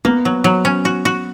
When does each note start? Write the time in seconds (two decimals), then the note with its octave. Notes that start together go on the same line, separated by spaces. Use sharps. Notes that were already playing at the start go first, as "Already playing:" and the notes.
0.05 A#3 B3
0.25 F#3
0.44 F#3
0.65 C#4
0.85 F#4
1.05 F#4